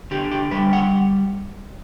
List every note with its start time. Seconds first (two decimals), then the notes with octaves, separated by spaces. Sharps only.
0.11 D3 G4
0.31 G4
0.51 G3 B4
0.73 F#5